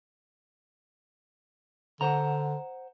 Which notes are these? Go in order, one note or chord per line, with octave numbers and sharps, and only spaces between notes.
D3 C5 F#5 A#5